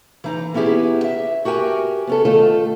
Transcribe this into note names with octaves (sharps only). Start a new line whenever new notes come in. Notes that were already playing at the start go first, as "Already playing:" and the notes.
E3 D#4 A#5
B3 C#4 E4 G4 G#4
E5
F#4 G4 A#4 G5 G#5
B3 C#4 A4
D#3 A3 F4 A4